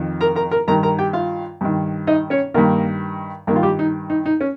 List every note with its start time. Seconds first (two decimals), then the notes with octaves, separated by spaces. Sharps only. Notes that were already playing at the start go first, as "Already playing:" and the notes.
Already playing: F2 D#3
0.21 A#4 A#5
0.36 A#4 A#5
0.51 A#4 A#5
0.68 G2 D#3 A#4 A#5
0.83 A#4 A#5
0.99 G4 G5
1.13 F4 F5
1.61 G2 D#3
2.07 D#4 D#5
2.30 C#4 C#5
2.54 G2 D#3 A#3 A#4
3.47 G2 D#3 A#3 A#4
3.56 F4
3.63 G3 G4
3.79 D#4
4.10 D#4
4.26 D#4
4.41 C#4